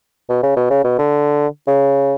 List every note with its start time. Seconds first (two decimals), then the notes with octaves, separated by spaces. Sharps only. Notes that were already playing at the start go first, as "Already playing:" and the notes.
0.29 B2
0.43 C#3
0.56 B2
0.70 C#3
0.84 B2
0.99 D3
1.67 C#3